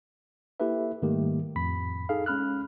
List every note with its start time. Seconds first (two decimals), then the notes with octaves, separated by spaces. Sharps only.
0.60 A#3 E4 G4 A4 B4 E5
1.02 G#2 D#3 G3 A3 A#3 G4
1.56 F2 A2 B5 B6
2.09 D#4 G#4 A4 F5
2.26 G#3 C#4 B5 F6 F#6